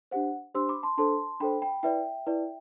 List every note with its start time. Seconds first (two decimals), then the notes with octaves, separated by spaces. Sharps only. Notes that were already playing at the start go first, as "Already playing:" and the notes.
0.11 D4 G4 C5 F#5
0.55 D4 G4 C5 C6 E6
0.69 B5 D6
0.83 A5 C6
0.98 D4 A4 C5 A5 C6
1.40 D4 A4 C5 G5 B5
1.62 G5 B5
1.83 E4 B4 D5 E5 G5
2.26 E4 B4 D5